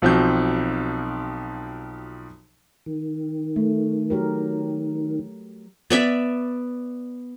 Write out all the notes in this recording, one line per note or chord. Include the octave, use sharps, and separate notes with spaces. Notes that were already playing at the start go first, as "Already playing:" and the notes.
B1 F3 C4 F#4 G6
D#3
A3
F#3 G4 A#4
B3 D5 E5